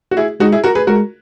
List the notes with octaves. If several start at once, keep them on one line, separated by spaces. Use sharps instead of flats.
F#4
E4 G#4
G#3 D#4 F#4
E4 G#4
F#4 A#4
G#4 B4
G#3 F#4 A#4